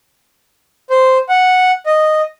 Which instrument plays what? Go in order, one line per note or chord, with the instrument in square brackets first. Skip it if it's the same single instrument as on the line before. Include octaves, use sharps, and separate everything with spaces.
[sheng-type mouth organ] C5
F#5
D#5